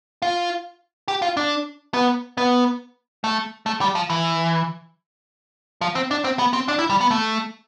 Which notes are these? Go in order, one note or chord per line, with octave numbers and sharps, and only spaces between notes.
F4
G4
F4
D4
B3
B3
A3
A3
G3
F3
E3
F3
C4
D4
C4
B3
C4
D4
E4
G3
B3
A3